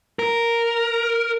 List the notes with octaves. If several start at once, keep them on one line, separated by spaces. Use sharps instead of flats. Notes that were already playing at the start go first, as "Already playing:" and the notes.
A#4